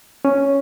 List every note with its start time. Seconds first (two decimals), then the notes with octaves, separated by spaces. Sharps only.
0.25 C#4